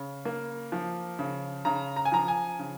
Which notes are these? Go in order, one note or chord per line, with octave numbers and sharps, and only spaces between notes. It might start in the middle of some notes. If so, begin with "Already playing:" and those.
Already playing: C#3
A#3
F3
C#3
C#3 A#5
A#5
G#5
F3 A#5
G#5
C#3